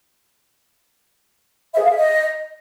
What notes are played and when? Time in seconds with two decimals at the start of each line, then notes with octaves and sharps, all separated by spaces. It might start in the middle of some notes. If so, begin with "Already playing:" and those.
1.73 E5
1.79 G#4
1.85 F5
1.90 E5
1.96 D#5